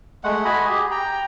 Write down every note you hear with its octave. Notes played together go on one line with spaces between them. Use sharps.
G#3 A3 F#5
F#4 D#5 G#5 B5
G4 G#4
G5 A#5